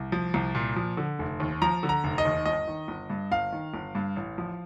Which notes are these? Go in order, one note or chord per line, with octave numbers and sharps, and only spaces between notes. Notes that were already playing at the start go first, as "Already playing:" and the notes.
Already playing: C2
F3
C2
A#2
F3
D3
F1
D#2
F3 A#5
D3
A#5
F1
D#5
D#2
G1 D#5
D#3
G1
G2
G1 F5
D#3
G1
G2
A1
F3